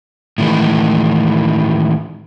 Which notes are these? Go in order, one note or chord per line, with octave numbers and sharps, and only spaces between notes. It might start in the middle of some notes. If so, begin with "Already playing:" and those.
A2 D#3 E3 G#3